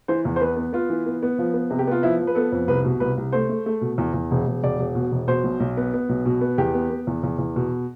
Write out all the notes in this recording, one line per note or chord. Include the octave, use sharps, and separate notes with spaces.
E3 C5
E2
C5
B3 B4
B3
B3 F4
E3
B3
B3
F3
B3
C3
G4
B3 F4
F3 E4
F3
B4
B3 A4
F2
C2 B4
B2
C2 B4
C2
A3 C5
A3
A3
B2
E2
E2
E1
E1
E1 D5
E1
B2
E1
B2 C5
B1
B1
B3
B3
B1
B2
B3
E2 G4
B3
B3
E2
E2
E2
B2